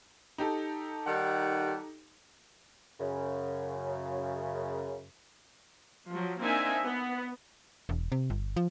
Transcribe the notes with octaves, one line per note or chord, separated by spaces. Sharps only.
D#4 G4 A4
D#3 G3 F#5
F#2 C#3
F3 F#3
A#3 C4 D4 D#4 E5 G#5
B3
E1
C3
G1
F3